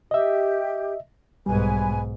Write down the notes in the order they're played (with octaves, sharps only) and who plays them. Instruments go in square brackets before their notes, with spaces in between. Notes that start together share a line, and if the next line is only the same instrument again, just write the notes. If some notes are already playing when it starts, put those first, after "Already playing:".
[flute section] G4 [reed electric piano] D#5 E5
[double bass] B1 G#2 [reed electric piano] G3 [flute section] B4 G#5